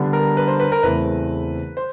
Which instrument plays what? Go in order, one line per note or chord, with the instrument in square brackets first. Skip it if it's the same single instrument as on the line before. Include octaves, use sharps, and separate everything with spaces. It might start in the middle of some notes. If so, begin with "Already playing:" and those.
Already playing: [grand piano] D3 G3 B3 D4
[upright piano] A#4
B4
C5
B4
A#4
[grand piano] E2 C#3 E3 A3 C4 [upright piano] B4
[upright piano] C5